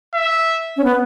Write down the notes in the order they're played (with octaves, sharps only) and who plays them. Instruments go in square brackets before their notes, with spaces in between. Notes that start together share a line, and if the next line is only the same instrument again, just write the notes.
[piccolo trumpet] E5
[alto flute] C#4
B3